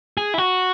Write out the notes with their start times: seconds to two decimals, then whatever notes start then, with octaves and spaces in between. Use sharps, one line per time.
0.17 G#4
0.34 E4
0.38 F#4